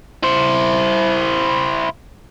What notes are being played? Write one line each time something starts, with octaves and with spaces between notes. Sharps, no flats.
E4 C5